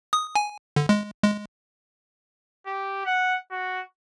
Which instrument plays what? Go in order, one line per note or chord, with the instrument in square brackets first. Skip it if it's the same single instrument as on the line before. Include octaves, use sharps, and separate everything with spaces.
[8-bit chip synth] D#6
G#5
D3
G#3
G#3
[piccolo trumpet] G4
F#5
F#4